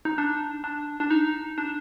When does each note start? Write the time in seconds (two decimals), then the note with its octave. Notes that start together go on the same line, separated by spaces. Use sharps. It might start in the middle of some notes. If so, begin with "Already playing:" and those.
0.05 D#4
0.18 D4
0.64 D4
1.00 D4
1.10 D#4
1.58 D4